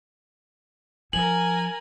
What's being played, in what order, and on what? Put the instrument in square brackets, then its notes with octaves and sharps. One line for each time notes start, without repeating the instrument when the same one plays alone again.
[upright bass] F3 [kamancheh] A#4 G#5 [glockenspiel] F#7